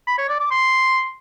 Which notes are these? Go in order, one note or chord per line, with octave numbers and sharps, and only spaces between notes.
B5
C#5
D5
D6
C6